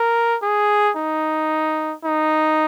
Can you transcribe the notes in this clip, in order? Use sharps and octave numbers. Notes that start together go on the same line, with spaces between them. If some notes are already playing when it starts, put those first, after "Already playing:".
Already playing: A#4
G#4
D#4
D#4